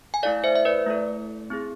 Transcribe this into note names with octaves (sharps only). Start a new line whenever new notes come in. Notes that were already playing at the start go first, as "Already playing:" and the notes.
G#5
A3 E4 A4 D5 F5
C5 E5
E5
B4 D5
A3 E4 A4
C4 E4 G#4